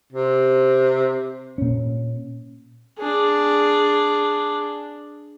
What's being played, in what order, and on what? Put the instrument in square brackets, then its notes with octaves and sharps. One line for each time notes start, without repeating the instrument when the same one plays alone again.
[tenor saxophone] C3
[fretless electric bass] A#2 C#4
[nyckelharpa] D4 G#4